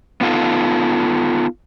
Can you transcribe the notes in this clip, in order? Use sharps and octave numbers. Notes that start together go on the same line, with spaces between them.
B3 D#4 F4 A4